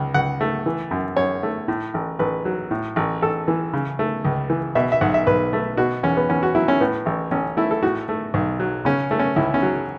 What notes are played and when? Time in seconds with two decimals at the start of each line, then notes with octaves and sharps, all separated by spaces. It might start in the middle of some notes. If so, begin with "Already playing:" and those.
Already playing: C#2
0.14 C#2 F#5
0.41 A3
0.66 E3
0.91 F#2
1.16 F#2 C#5
1.43 A3
1.68 A2
1.94 A1
2.19 A1 B4
2.45 F#3
2.71 A2
2.96 A1
3.22 A1 A4
3.48 E3
3.73 C#3
3.99 A3
4.25 C#2
4.50 E3
4.75 B2 E5
4.92 E5
5.01 B1 F#5
5.14 E5
5.27 B1 B4
5.53 A3
5.77 B2 F#4
6.03 E2 C#4
6.17 B3
6.29 E2 C#4
6.43 F#4
6.55 F#3 E4
6.68 C#4
6.80 A2 B3
7.06 A1
7.31 A1 C#4
7.57 A3 E4
7.71 A4
7.83 A2 F#4
8.09 A3
8.34 B1
8.60 F#3
8.85 C#3 C#4
9.11 A3
9.19 C#4
9.36 C#2 E4
9.54 C#4
9.62 F#3